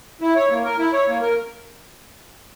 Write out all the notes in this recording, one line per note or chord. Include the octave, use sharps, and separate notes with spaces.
E4
C#5
A#3
A#4
E4
C#5
A#3
A#4